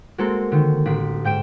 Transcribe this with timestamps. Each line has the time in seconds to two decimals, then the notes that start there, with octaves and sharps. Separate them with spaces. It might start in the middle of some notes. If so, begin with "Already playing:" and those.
0.18 G#3 A#3 C4 F#4 A4 A#4
0.52 D3 D#3
0.85 A1 D4 B6
1.24 G#2 G5 D7 E7